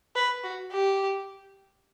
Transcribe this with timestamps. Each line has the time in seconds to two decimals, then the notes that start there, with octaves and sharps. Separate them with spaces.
0.16 B4
0.44 F#4
0.72 G4